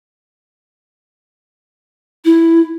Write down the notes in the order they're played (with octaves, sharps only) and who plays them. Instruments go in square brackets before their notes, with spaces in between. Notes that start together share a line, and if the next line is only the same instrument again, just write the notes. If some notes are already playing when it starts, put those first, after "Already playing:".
[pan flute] E4